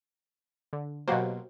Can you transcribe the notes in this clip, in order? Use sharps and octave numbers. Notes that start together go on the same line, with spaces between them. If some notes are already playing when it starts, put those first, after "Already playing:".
D3
B2 F#3 A#3 F#4 G4 C5